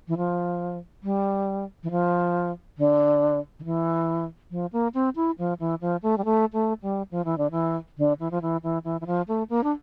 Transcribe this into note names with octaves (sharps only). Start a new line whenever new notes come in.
E3
F3
G3
E3
F3
D3
D3
E3
F3
A#3
C4
E4
F3
E3
F3
A3
G3
A3
A3
G3
F3
E3
D3
E3
D3
E3
F3
E3
E3
E3
E3
F3
A3
A#3
D4